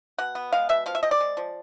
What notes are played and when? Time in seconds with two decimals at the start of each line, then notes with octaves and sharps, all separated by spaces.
0.18 B2 F#5
0.35 B3
0.52 G#3 F5
0.69 B2 E5
0.86 F3 F5
0.95 E5
1.03 C4 D#5
1.11 D5
1.20 G#3
1.37 F3